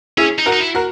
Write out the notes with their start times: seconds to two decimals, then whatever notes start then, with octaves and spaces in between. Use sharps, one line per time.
0.17 C#4 E4 G#4
0.39 D#4
0.46 F#4 A#4
0.53 D#4
0.60 E4
0.75 F#4 A#4